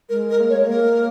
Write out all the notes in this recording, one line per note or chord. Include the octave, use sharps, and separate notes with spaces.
G#3 A#4
A#4
A#3
C#5
G#3
A#3 A#4